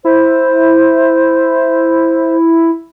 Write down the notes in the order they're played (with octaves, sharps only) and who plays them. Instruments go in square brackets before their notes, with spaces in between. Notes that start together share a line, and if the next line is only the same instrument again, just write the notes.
[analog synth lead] E4 [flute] C5